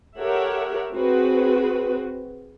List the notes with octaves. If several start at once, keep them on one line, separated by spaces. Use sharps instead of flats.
G4 A4 A#4 C#5 E5 F#5
C4 F#4 G#4 B4